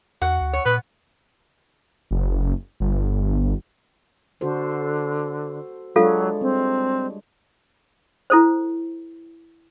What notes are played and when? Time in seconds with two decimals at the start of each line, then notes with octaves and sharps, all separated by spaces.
0.22 E2 F#4 F#5
0.41 D2
0.53 C#5
0.66 A#2 B3 B4
2.11 F#1
2.80 G1
4.41 D3 F#4 A4 C5
5.96 F#3 G#3 D4 F4 A4 C#5 F5
6.41 G3 C4
8.30 E4 A4 C5